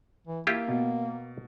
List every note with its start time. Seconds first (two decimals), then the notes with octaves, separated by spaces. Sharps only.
0.27 E3
0.47 A#3 E4 F4 G4
0.68 B2